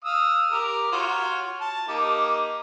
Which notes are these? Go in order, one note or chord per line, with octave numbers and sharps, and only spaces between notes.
F5 D#6 E6
G4 A#4
F4 F#4 C#5
A5
A#3 D#4 G4